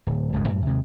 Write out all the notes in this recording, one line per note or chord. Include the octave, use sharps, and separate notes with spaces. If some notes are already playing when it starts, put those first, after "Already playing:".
D1
G#1 C#2 F#2 G#3
F#2 A2
D#2 C3 G#3